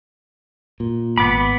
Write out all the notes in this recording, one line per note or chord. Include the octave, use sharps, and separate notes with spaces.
A#2
G#1 B3 B5 D6